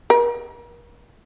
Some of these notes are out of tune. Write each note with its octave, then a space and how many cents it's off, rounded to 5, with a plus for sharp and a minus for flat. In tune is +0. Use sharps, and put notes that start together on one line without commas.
A#4 +40